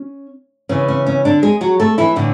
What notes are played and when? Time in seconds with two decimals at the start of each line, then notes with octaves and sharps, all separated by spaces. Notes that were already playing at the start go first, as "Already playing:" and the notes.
Already playing: C#4
0.69 C#3 E3 B3 C#4
0.88 C#4
1.06 C#4
1.25 D3 D4
1.42 G#3 G#4
1.61 F#3 F#4
1.80 A3 A4
1.98 E3 E4
2.16 A2 D3 E3 D4